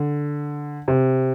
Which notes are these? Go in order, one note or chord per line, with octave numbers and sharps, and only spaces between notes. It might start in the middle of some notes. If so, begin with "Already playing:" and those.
Already playing: D3
C3